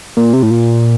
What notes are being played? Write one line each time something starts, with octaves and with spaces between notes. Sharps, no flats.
A#2
C3
A2
A#2